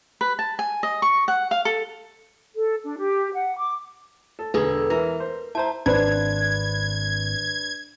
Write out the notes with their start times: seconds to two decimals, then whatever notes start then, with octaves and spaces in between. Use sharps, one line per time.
0.21 B4
0.39 A5
0.59 G#5
0.83 D#5
1.02 C#6
1.28 F#5
1.51 F5
1.65 A4
2.56 A4
2.83 D4
2.98 G4
3.34 F#5
3.56 D6
4.39 A4
4.54 E1 D3 G#4 A4 B4
4.90 E3 A#4
5.20 C5
5.55 E4 C5 A5 A#5
5.86 G#1 D4 B4 C5 G#6